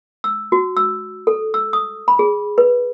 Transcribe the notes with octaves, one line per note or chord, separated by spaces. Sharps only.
E6
F#4
E6
A4
E6
D#6
B5
G#4
B4